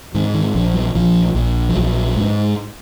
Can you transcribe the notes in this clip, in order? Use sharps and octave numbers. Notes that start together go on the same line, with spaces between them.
G#2 D#3
D#3
A#1 F3
F#3
A#1 F3
A#1
F3
A#1 F#3
G#2